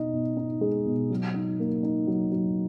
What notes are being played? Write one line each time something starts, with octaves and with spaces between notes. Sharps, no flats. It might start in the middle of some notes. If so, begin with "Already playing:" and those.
Already playing: B2 D#4 D#5
B2
D#4
G#3
B2
F#3
D#4
A#3
D#4
F#3
F#3